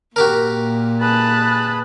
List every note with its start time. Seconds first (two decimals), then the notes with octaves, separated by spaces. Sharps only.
0.16 A#2 F#4 G4 A#4
1.01 G#4 B4 A5 B5 F#6